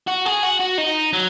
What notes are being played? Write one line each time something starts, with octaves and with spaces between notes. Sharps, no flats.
F#4
G#4
F#4
F#4
D#4
F#3